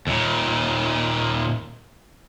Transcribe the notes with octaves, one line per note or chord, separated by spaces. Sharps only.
D#2 A#2